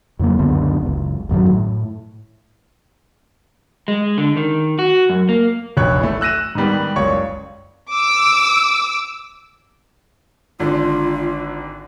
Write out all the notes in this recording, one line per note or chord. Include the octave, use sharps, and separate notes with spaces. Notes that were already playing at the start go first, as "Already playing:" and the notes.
F2 C#3 F#3 A#3
C#2 F#2 D3 B3
F#1 C#2
A1 F#2 D#3 F#3
A2
G#3
D3
D#3
F#4
F#2
A#3
F1 A#1 C#5 F#6
E3 A3
E6 F#6 A#6 D#7 E7
G#2 D#3 G3 B3
F#1 C#2 C#5 D5 C#6
D6 E6
G#1 D3 F4